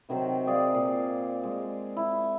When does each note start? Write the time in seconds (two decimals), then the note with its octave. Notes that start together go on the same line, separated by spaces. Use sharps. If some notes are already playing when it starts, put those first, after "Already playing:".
0.09 C3 D#3 F#3 C4
0.47 G#4 D5 F5
0.74 A#2
1.43 G#3
1.97 E4